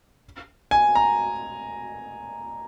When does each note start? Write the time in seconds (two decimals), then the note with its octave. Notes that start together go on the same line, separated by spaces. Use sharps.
0.71 G#5
0.95 A#5